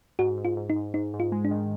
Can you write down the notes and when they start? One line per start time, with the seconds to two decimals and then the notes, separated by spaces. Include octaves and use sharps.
0.19 G#2 F#4
0.37 G#2
0.45 F4
0.57 G#2
0.70 D#4
0.76 G#2
0.94 G#2 D#4
1.14 G#2
1.20 F4
1.32 G#3
1.45 D4
1.51 D#3